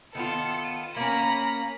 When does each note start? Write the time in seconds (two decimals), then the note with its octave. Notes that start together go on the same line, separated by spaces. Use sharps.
0.15 D#3 B3 F4 A4 C#7
0.64 D#7
0.96 A#3 C#4 A#5 B5